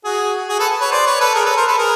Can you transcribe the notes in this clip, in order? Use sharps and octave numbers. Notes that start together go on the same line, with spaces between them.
F#4 G#4
F#4 G#4
A4 B4
B4 C#5
C5 D5
B4 C#5
A4 B4
G#4 A#4
A4 B4
A#4 C5
A4 B4
G#4 A#4